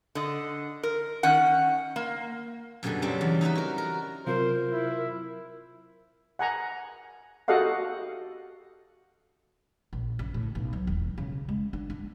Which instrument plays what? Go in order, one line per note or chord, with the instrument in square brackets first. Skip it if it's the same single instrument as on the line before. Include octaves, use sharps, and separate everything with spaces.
[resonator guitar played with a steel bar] D3 D#5
A#4
D#3 C#4 F#5
A#3
[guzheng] F#2 B2 D3 G3 G#4
C#3 F#3 G3 C4
E2
D#4 E4 F#4 B4
F#4 A#4
A#4
[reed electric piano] C3 F#3 F4 [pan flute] A#4 [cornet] C5
[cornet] E4
[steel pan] F#5 G#5 A#5
F#4 G4 A4 D#5 F5 F#5
[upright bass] A#1
C#3
A2
B1
F#3
E1
C#3
G#3
D4
D4